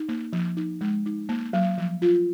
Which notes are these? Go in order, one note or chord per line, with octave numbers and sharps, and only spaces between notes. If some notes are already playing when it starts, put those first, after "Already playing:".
Already playing: D#4
A#3
F3
D#4
G#3
D#4
A#3
F#3
F3
F4